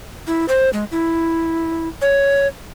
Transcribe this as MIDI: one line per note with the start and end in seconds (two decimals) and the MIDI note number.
0.27 0.45 64
0.48 0.70 72
0.73 0.84 56
0.91 1.88 64
2.02 2.47 73